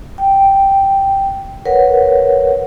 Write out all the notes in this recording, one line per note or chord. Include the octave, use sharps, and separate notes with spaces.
G5
A#4 B4 C#5 F#5